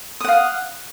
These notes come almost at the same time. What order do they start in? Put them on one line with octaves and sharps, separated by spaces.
D#6 F#5 F5